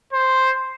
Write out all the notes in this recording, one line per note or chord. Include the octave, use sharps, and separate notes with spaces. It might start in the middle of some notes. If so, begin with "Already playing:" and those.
C5